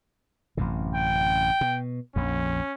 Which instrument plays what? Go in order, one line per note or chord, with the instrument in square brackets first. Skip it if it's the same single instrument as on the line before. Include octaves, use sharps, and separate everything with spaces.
[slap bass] A1 F#2 C3
[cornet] G5
[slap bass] B2
[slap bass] A#1 F2 [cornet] C#4